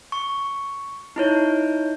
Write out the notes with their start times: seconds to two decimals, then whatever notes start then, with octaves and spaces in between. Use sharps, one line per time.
0.12 C#6
1.16 D#4 E4 C#5